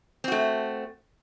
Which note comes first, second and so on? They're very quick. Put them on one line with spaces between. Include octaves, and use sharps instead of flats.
C4 F#4 A3